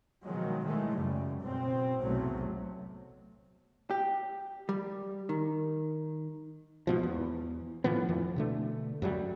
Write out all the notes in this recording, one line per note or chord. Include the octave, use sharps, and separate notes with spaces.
B2 D#3 F3 F#3 G#3
D#3 E3 G#3 A3
F#2 C#3 G3
F#1 B2 C4
B1 E2 A2 C3 F#3 A3
G4
G3
D#3
G#2 B2 F3
E2
A2 E3 F3 B3
F2 E3
B2 D3 A3
F#2 F#3 G3